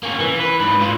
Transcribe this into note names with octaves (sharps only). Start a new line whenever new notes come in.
A#3 C#4
E3
B4
G#2 B4
A2 F4